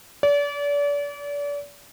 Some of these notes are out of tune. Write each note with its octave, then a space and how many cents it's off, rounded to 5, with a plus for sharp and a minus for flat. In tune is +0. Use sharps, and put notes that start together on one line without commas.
D5 -35